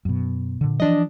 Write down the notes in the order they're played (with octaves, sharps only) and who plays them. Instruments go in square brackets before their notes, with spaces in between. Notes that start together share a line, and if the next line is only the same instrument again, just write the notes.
[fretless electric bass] F#2 B2
A#2 D3
[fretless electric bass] E3 F3 [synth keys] D4 D#5